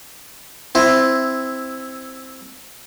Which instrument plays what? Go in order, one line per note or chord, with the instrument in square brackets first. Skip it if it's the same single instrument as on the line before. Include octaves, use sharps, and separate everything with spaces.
[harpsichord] C4 E4